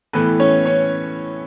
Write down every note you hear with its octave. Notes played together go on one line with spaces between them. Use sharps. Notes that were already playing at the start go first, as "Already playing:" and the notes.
A2 E3 A3 B3 B4
C#4 C#5
C#4 C#5